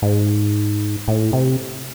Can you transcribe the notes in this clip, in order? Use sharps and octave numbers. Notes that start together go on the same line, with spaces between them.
G#2
A2
C3